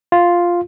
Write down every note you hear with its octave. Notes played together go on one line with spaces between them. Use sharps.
F4